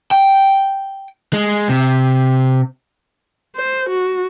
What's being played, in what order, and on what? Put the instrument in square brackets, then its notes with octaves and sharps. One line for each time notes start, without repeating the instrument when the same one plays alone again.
[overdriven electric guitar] G5
G#3
C3
[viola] C5
F#4